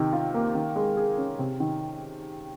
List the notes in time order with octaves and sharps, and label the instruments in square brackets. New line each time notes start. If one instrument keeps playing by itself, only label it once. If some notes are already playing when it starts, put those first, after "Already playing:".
Already playing: [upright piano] C3 D#3
F4
A#3
D#3
G#3
G#4
C#4
C3
D#3